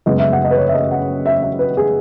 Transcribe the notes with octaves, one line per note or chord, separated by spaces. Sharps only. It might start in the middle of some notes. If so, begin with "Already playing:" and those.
F#1 F#2 C#3 G#3 B3 D#5
E5
F#5
D#5
B4
C#5
E5
D#5
F#5
E5
E5
B4
G#4